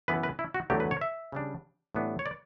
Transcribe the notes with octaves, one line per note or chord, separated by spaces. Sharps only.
F#2 E3 B3 B4
B4
E4
F#4
E2 D3 F#3 A3 G4
B4
C#5
E5
C#3 G3 D4
A2 E3 G3 B3 D4
C#5
D5